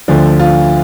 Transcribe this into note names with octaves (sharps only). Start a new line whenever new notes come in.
D2 D3 F3
F4